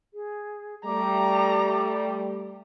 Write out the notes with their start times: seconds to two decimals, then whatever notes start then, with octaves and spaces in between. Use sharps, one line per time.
0.14 G#4
0.85 G3 A3 A#5 D6